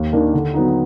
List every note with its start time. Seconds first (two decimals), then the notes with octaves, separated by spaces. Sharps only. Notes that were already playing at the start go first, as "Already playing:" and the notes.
Already playing: D#2
0.12 D#3 A#3 D4
0.34 D3
0.54 F#3 B3 D#4